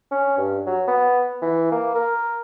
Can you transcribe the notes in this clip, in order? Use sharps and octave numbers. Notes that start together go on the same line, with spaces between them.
C#4
G2
F#3
B3
E3
A#3
A#4